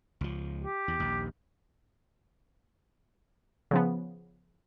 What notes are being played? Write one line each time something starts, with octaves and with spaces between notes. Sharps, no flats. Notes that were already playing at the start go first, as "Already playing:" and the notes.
C#2 F3
G4
E2
A#1 D#2
C#3 F3 B3